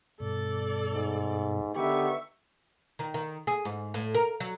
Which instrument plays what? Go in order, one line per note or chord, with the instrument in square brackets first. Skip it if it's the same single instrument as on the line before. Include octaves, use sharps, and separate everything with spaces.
[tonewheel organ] G2 B2 [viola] A4 D5
[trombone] G#2
[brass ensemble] D3 D#3 B3 [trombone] G4 [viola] E5 C#6
[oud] D#3
D#3
G#4
G#2
A2
A#4
F#3